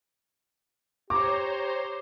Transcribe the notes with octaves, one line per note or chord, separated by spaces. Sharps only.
G4 C5 C#5 A#5 D6